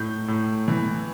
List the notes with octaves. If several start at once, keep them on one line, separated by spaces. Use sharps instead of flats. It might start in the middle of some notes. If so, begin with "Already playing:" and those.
Already playing: A2 G6
A2
E3